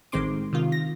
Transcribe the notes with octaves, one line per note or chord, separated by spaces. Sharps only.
A1 D#3 G#3 C4 C6 D6
C3 D#3 F4
A#6